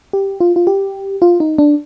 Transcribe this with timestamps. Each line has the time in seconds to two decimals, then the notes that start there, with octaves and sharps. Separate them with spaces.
0.13 G4
0.40 F4
0.56 F4
0.67 G4
1.22 F4
1.40 D#4
1.58 D4